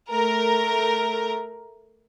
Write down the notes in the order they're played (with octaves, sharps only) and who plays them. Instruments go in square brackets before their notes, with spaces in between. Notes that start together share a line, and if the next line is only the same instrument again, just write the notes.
[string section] A3 A#4